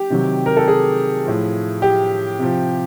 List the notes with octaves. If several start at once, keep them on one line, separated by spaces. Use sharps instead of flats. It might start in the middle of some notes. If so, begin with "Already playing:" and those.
Already playing: G4
C3 D#3 F#3
A#4
A4
G#4
A2 F3
G4
C3 F3